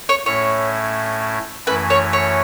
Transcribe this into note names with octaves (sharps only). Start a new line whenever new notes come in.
C#5
A2 A3 C#4 E4 C#5
F#2 E3 A3 C#4 E4 B4
C#5
C#5